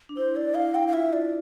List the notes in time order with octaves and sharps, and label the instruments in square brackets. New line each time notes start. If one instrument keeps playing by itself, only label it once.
[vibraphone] D4
[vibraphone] E4 [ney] C5
[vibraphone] E4 [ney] D5
[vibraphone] E4 [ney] F5
[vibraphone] E4 [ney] G5
[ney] F5
[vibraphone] F4 [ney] E5
[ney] D5